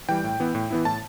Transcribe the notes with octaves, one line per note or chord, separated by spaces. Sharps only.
E3 G3 G5
A2
E3 B3 E4
A2
E3 B3 E4
A2 A5